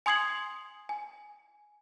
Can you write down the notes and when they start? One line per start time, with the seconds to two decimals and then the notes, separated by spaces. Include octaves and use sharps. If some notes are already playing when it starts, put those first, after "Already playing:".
0.06 G#5 C6 D#6 G#6 C7 F#7
0.89 G#5